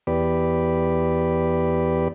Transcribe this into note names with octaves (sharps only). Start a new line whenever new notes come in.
E2 B3 G4 B4 D5